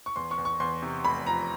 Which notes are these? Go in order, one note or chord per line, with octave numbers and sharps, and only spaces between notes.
C#6
E2 C6
C#6
E2
C#6
E2 C6
C3
F1 B5
F3 A#5